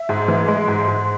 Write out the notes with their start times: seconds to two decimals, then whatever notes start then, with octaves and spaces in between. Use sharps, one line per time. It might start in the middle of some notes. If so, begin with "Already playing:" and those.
Already playing: E5
0.09 G#2
0.28 E3
0.48 G#3
0.68 G#2
0.88 G#2